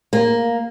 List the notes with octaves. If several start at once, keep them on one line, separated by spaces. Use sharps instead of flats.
A#3